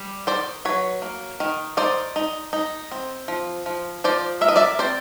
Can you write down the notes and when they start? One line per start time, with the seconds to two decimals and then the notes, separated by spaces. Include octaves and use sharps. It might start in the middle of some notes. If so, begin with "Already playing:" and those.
Already playing: G3
0.27 D#3 C5 D5
0.65 F#3 B4 C#5
1.02 A#3
1.40 D#3
1.77 D#4 C5 D5
2.16 D#4
2.53 D#4
2.92 C4
3.28 F3
3.66 F3
4.04 F3 C5 D5
4.41 A#3 E5
4.48 D#5
4.56 D5 E5
4.79 C4 C5 D5